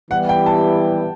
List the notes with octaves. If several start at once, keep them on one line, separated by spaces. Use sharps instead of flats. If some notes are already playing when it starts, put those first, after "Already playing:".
E3 G3 B3 E4 G4 F#5
G5
A5